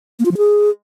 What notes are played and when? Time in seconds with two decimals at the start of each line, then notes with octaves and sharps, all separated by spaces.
0.19 A#3
0.25 F4
0.31 F3
0.37 G#4